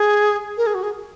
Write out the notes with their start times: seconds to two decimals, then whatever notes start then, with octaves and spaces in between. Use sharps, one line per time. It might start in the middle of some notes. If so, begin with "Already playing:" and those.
Already playing: G#4
0.57 A#4
0.67 G#4
0.74 F#4
0.83 G#4